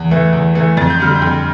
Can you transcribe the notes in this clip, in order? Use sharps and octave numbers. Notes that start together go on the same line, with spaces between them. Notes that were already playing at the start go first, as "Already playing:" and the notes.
Already playing: E2
E3 A3
E2
E3 A3
F2 A6
G6
D3 G3 F6
G6
F2